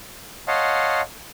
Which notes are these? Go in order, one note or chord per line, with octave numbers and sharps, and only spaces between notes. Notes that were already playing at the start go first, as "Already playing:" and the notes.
C#5 D#5 F5 F#5 A5 C6